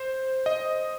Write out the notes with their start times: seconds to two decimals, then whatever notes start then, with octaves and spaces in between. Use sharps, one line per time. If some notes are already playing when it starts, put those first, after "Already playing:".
Already playing: C5
0.46 D#5